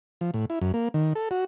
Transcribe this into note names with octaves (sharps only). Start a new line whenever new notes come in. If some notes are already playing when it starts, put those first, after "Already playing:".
F3
A2
E4
F#2
A#3
D#3
A4
F#4